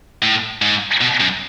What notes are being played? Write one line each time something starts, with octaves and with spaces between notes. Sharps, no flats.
A2
G#2
B2
F#2